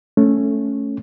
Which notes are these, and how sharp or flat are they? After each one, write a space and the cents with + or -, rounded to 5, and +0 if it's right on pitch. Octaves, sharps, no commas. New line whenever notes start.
A3 +0 C#4 +0